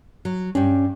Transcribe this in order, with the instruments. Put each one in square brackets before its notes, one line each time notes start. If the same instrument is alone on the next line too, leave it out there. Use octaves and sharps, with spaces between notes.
[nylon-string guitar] F#3
[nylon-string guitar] G2 G3 [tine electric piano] C#4